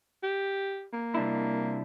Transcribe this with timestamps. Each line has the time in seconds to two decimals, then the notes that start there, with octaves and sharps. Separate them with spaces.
0.23 G4
0.93 A#3
1.15 C2 D4 E4